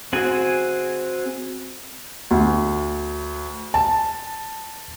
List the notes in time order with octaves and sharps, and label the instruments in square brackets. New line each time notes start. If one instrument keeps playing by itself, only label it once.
[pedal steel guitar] C4 F#4 G#4 G#5
[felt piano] D2
A5